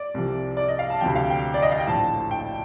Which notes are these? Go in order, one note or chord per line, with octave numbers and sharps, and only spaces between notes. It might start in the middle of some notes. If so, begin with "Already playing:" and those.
Already playing: D5
C2 C3 F3
D5
D#5
F5
A5
D2 C3 F3 G5
F5
G5
D5
D#5
F5
G5
A#1 A2 F3 A5
G5